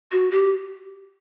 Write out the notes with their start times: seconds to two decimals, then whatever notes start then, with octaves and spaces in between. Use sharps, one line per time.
0.12 F#4
0.31 G4